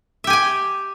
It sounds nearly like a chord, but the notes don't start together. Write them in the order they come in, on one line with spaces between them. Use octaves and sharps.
E5 G4 G#5 G5